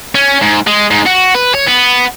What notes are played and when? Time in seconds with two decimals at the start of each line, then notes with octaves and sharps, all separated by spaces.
0.15 C#4
0.41 G#2
0.67 G#3
0.91 G#2
1.06 F#4
1.35 B4
1.54 C#5
1.67 B3